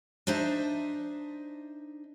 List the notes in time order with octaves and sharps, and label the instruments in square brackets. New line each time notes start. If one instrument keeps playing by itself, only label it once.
[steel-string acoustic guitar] D4 D#4 C5 D#5 E5 A5